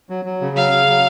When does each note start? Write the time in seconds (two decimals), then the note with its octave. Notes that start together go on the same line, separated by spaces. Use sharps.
0.10 F#3
0.25 F#3
0.41 C#3
0.56 F#3 F5
0.72 C#3
0.88 F#3